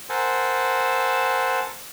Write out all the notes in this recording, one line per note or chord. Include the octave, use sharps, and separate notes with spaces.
A#4 C5 F#5 G#5 A5 E6